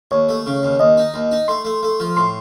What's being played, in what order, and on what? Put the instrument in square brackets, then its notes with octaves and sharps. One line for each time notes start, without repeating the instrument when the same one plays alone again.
[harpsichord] D#2 [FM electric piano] C#5
[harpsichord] A3
C#3
D#2
[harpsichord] D#2 [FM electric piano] D#5
[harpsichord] D#4
D#2
D#4
[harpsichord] A3 [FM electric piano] C6
[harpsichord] A3
A3
F3
[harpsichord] A2 [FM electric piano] C6